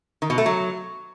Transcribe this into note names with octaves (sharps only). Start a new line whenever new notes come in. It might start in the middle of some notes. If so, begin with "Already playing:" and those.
D#3
B2
A3
F#3